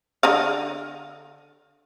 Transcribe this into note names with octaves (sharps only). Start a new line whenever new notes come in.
D3 D#5 F5